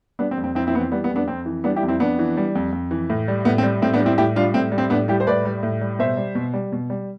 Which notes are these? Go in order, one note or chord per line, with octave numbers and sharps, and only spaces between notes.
G3 B3 D4
C4
F2
C4
F2 C4 E4
C4 E4
E3 B3
C4
G3 B3
B3
F2
B3 D4
F2 C4
E3
G3 B3 D4
E4 G4
F2
C4 E4
F2 B3 D4
E3
G3
F2
F2
E3
A2
G3
A2 B3
C4
G3
A2 C4
B3 D4
G3
C4 E4
A2 E4 G4
G3 D4 F4
A2 C4
G3
C4
A2 B3 D4
G3 E4 G4
C5
A2 B4 D5
G3
A2
G3
B2 C5 E5
G3
B2
G3
B2
G3